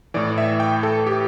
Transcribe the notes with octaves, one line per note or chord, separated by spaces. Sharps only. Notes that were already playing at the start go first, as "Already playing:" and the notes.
A2 E3 D5
E5
G5
A4
G4